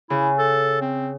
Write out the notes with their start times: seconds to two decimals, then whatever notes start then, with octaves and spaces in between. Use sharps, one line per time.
0.10 C#3 E4
0.39 A4
0.81 C4